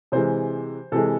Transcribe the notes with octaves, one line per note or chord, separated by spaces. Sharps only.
C3 E3 G#3 C5
C3 E3 G#3 A4